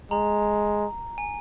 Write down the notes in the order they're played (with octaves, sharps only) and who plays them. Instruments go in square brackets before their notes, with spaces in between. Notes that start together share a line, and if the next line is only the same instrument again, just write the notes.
[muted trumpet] G#3 [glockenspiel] A#5
[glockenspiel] G#5